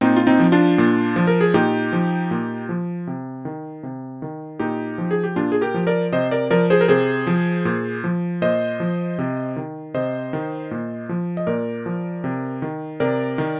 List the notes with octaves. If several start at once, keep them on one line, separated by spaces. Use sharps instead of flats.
A#2 C4 D#4
F4
C4 D#4
F3
D4 F4
A#2
F3
A#4
G#4
A#2 D#4 G4
F3
A#2
F3
C3
D#3
C3
D#3
A#2 D#4 G4
F3
G#4
G4
A#2 D4 F4
G#4
G4 A#4
F3
A#4 D5
C3 C5 D#5
A#4 D5
F3 A#4 D5
G#4 C5
A#4
C3 G#4 C5
F3
A#2
F3
A#2 C5 D#5
F3
C3
D#3
C3 C5 D#5
D#3
A#2
F3
D#5
A#2 A#4 D5
F3
C3
D#3
C3 A#4 D5
D#3